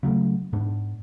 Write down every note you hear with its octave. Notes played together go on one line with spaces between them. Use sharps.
C#3 F#3 G3 A3
G#2 B3 D4